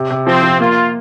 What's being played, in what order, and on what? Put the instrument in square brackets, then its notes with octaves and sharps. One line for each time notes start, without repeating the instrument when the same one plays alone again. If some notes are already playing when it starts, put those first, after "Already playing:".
Already playing: [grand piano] C3
C3
[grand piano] F3 [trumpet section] C4
[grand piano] F3
[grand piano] A#3 [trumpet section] F4